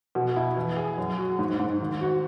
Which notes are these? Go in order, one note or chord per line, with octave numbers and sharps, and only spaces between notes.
B2
E4
E3
G#4
F#2
F#4
G#2
G#2
D#3
F#4